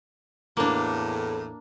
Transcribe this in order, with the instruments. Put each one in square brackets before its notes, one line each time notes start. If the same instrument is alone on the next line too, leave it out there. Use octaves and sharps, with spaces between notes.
[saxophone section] E2 A2 [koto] A#3 D4